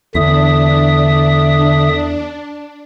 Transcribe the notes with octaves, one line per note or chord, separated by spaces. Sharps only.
E2 D3 D4 E5 D#6